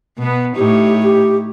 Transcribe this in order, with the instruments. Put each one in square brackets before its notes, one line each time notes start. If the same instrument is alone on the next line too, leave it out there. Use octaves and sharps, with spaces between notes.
[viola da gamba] B2 B3
[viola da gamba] A2 D#4 C#5 [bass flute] G4
[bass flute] G4